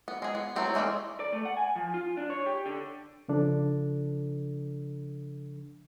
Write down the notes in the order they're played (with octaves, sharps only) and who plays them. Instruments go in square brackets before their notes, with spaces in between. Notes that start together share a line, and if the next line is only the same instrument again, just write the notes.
[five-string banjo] B3
G#3 G#4
B3
F#3 A3 B3 C4 E4
E3 G#3 A3 C#4 D5
[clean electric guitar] D5
A3
F#5
G#5
F3
F4
D4
C#5
G4
D3
[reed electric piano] C#3 F3 D4 A4